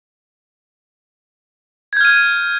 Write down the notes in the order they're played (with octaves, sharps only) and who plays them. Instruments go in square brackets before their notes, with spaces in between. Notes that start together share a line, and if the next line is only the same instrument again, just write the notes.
[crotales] G#6
G6
F6
D#7